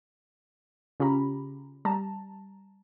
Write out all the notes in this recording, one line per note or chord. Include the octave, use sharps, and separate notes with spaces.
C#3 C#4 F4 G4 A#5 B5
G3 A5 A#5